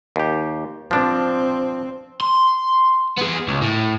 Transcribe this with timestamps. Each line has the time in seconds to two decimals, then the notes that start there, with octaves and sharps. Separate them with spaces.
0.16 D#2 G4
0.91 F3 C4 D4
2.21 C6
3.18 B3 G#4
3.48 C#2
3.62 A2